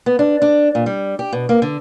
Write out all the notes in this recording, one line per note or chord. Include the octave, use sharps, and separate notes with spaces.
B3
D4
D4
A#2
G3
G4
B2
A#3
D3